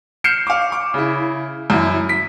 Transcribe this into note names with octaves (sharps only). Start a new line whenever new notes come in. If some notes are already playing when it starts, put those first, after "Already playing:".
F6 G6 C7 C#7 E7
F5 D6
D6
C#3 E4
F#2 E4
B6